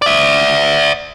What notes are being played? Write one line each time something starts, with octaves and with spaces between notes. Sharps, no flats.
D5 E5